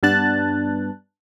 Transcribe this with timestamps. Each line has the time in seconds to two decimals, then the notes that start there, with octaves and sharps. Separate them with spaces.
0.03 G2 B3 D4 A5 F#6 A6